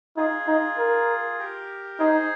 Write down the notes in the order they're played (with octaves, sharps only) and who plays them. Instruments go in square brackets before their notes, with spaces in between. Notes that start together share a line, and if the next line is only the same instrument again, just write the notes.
[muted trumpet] D#4 [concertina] F4 G#4
[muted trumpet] D#4
A#4
[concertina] G4 A#4
[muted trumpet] D#4 [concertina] G#4 C5